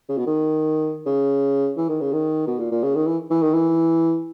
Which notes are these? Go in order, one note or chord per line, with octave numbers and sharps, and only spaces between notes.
C#3
B2
D#3
C#3
E3
D#3
C#3
D#3
B2
A#2
A#2
C#3
D#3
E3
E3
D#3
E3